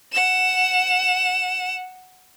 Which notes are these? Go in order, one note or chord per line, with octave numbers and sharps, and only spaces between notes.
F#5 E7